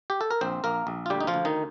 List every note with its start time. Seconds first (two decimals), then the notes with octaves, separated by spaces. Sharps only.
0.10 G4
0.21 A4
0.31 A#4
0.41 A#1 C4 C5
0.64 A#1 A#3 A#4
0.87 A#1
1.06 F4
1.10 D2 G3 G4
1.21 D#4
1.27 F3 F4
1.34 D2
1.45 D#3 D#4